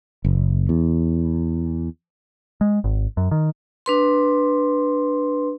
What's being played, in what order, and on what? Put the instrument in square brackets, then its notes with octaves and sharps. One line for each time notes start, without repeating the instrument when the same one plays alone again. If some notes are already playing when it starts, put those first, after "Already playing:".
[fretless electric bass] F#1
E2
[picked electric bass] G#3
G#1
F#2
D#3
[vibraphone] D4 B4 C6